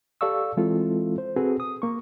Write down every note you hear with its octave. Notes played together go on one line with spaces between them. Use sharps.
G4 A4 D5 F5 C#6 E6
E3 G#3 C4 E4 F4 A4
C5
C4 F#4 G#4 A4 B4
D#6
A#3 C#6